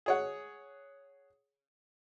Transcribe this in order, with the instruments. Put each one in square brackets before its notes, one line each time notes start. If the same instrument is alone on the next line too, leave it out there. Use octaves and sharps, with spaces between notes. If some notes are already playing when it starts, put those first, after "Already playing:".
[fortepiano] G#4 C#5 F#5